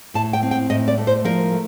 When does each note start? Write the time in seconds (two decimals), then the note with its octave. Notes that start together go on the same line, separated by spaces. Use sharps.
0.14 A2 A5
0.33 G5
0.43 C4
0.51 G5
0.70 A2 D#5
0.88 D5
0.98 A3
1.07 C5
1.25 F3 A#4
1.52 A3